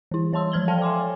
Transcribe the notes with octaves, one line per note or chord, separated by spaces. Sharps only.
E3 E4
G3 C#5 A5 C6 E6
F3 C5 F6 G#6 F#7 G7
A4 D5 F5 G5 A5
E5 G#5 C6 D6
C#5